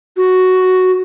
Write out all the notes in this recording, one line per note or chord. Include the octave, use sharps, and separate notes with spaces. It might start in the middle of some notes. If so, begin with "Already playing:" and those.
F#4